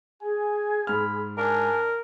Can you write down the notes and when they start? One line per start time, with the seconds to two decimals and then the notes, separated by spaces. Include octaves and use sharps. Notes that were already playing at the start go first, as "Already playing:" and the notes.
0.21 G#4 G#5
0.87 G#2 B5 F6
1.38 D4 A#4 G#5